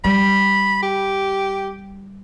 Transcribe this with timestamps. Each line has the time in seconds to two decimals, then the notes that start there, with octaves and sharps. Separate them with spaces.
0.04 G3 B5
0.83 G4